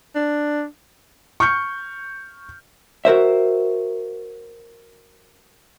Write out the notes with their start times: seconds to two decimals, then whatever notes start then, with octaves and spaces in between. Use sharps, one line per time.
0.15 D4
1.40 C#6 F6 G6 C#7
3.05 F#4 A#4 C5 E5